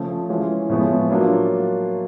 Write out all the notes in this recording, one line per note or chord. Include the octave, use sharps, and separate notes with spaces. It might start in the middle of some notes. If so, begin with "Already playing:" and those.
Already playing: C#3 F3 A3
E3 G#3 C#4 F4
A2 F3 G#3 B3
F#3 A#3 D4 F4